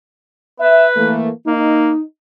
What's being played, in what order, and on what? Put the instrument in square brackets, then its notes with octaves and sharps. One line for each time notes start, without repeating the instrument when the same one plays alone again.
[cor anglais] B4 [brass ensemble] E5
[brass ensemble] E3 A3 A#3
[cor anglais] A#3 [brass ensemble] D#4